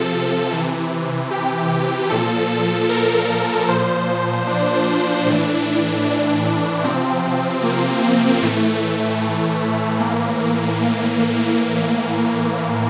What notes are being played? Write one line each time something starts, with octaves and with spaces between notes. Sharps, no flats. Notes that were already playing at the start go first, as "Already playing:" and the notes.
Already playing: C3 F3 A4
C3 E3
G4
A#2 F3 A4
A#4
A#2 F3 C5
D4
A2 E3
D4
C3 F3 C4
A#3
A2 E3 A3
A2 E3 A#3